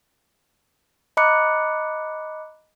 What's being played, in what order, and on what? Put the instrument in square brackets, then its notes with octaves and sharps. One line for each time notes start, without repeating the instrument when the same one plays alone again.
[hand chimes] D#5 A#5 B5 D6 F#6 C#7